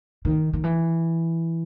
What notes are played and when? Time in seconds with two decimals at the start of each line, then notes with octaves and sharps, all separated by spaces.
0.25 D#3
0.53 D#3
0.64 E3